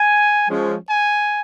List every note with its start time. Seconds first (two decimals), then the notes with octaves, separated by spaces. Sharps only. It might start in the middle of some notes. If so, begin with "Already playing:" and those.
Already playing: G#5
0.48 F3 G#3 C#4
0.88 G#5